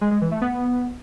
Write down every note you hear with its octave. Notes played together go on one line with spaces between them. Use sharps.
G#3
G#3
E3
A3
B3